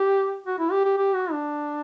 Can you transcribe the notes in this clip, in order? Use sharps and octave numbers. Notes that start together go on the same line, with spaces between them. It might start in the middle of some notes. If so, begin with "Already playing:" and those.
Already playing: G4
F#4
E4
G4
G4
G4
F#4
D4